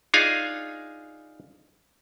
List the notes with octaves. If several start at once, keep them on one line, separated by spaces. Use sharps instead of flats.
D4 D#4 F4 G#4 F5 G#5